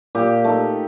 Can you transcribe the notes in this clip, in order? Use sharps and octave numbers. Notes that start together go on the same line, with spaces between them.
A#2 G4
A3 D#4